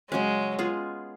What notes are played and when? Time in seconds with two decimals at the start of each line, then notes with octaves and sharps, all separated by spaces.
0.11 C#3 F#3 G#3 C#4
0.59 G#3 B3 F4 G#4